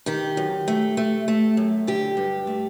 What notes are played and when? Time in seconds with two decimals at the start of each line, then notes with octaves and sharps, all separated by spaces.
0.06 D#3 G4
0.37 F#2
0.68 A3
0.97 A3
1.28 A3
1.57 F#2
1.87 D3 G4
2.17 G2
2.47 A3